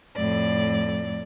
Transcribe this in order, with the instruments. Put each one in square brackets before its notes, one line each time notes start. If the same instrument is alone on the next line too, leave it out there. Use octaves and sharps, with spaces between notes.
[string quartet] F2 A2 D5